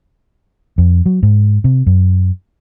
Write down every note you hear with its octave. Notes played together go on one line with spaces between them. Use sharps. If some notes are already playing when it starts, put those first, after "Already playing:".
F2
F#3
G#2
C3
F#2